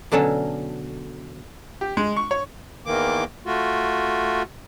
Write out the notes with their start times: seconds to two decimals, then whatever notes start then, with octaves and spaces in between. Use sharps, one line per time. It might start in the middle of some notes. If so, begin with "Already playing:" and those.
0.12 B2 D3 F#3 C#4 A4
1.81 G4
1.97 G#3
2.16 C#6
2.31 C#5
2.86 E2 D#3 E3 A#3 D6
3.46 A3 F4 F#4